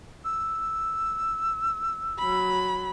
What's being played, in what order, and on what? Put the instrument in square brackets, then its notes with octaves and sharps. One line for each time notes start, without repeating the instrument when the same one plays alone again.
[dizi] E6
[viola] F#3 B5